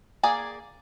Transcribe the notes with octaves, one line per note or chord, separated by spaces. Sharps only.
A#3 G#4 D5 G#5